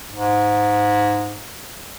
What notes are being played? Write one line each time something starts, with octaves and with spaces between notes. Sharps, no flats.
G#2